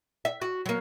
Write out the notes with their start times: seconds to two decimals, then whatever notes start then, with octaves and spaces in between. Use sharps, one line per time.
0.25 E5
0.42 F#4
0.66 F#3 A#3